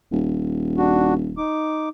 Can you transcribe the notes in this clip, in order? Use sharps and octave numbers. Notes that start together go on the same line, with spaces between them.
D#1
D4 F#4
D#4 D6